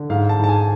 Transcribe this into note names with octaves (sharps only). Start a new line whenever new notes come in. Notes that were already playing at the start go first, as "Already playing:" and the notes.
Already playing: D3
G#2 F5
A5
G#2 A5
G#5